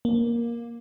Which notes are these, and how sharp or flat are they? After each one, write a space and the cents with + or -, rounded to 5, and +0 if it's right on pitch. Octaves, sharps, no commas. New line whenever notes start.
A#3 +10